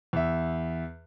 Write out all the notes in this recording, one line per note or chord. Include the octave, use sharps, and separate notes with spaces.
E2 E5